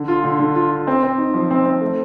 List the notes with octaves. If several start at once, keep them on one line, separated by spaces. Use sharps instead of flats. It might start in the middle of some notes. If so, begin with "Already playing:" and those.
Already playing: D3
F4
D3
D3
F4
F4
C4
C4
D#4
F3
C4
C4
A3